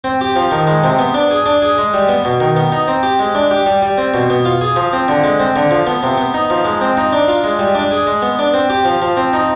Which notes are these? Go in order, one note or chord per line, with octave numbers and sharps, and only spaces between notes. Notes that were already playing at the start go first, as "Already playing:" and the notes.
C4
G4
F3
D#3
G#3
C3
B3
D4
G#4
D4
G#4
G#3
G3
B3
B2
D#3
B3
D#4
C4
G4
G#3
D4
G4
G3
G3
C4
B2
B3
F4
G#4
F3
C4
D3
G#3
C4
D3
F3
B3
C3
B3
D#4
F3
G#3
C4
D#4
D4
F4
G#3
G3
D4
G#4
G#3
B3
D4
C4
G4
F3
F3
C4
D#4